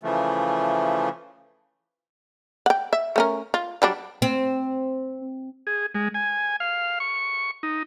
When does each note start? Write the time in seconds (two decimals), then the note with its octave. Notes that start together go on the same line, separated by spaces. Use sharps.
0.03 C#3 E3 F3 A3
2.66 F#5 G5
2.93 E5
3.16 A3 C#4 A#4
3.54 F4
3.82 F#3 G3 D4
4.22 C4
5.67 G#4
5.95 G#3
6.14 G#5
6.60 F5
7.00 C#6
7.63 D#4